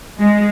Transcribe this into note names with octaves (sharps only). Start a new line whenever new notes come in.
G#3